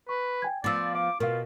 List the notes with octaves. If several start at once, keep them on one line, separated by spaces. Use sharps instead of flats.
B4 C#6
G5 G#5 G#6
F3 B3 D5 E6 A6
F5 D6
B2 F4 A#4 F5